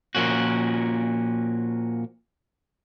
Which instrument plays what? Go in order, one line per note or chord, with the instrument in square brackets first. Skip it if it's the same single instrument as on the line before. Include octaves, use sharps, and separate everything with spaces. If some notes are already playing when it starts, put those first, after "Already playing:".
[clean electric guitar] A#2 F3 A#3 C#4 F#4